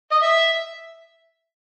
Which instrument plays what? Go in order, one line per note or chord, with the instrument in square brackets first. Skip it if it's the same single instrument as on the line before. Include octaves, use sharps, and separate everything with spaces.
[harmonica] D#5
E5